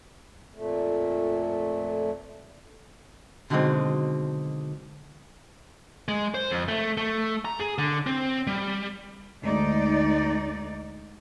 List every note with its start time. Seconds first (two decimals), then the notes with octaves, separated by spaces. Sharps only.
0.55 F2 A#2 A3
3.50 B2 D3 D#3 F#3 G#3 C4
6.08 G#3
6.34 C5
6.50 F2
6.68 A3
6.97 A3
7.45 A#5
7.60 G#4
7.78 D3
8.07 C4
8.47 G3
9.43 D2 G#3 D#4 D5